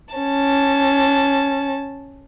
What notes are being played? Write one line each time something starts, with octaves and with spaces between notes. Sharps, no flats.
C#4 A5